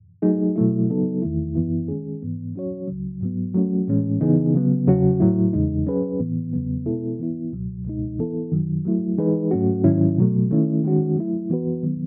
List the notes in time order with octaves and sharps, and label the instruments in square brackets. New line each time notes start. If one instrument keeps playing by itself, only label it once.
[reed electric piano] F#3 A3 D#4 G#4
B2 F#3 A3 E4
C#3 F#3 B3 D#4 A4
E2 D#3 A3 E4
F#2 E3 B3 E4
D#3 G#3 C#4 G#4
G#2 E3 B3
F#3 C#4 F#4 C#5
C#2 C#3 F#3
G#2 F#3 B3
F#3 A3 C#4 F#4
A2 E3 G#3 C#4
C#3 E3 B3 D#4 G#4
C#3 F#3 B3
E2 C#3 F#3 C#4 F#4
A2 F#3 A3 E4
E2 C#3 G#3 D#4
F#3 C#4 G#4 B4
A2 E3 B3
E2 C#3 F#3 B3
B2 G#3 B3 E4 A4
E3 B3 E4
C#2 B2 F#3
C#2 B2 G#3 D#4
E3 B3 E4 A4
F#2 D#3 F#3
F#3 A3 E4
E3 G#3 D#4 G#4 B4
G#2 F#3 A3 C#4 F#4
G#2 D#3 F#3 C#4 E4
B2 F#3 A3
D#3 A3 C#4 E4
D#3 G#3 C#4 F#4
F#3 A3 E4
E3 B3 F#4 B4
D#3 F#3 B3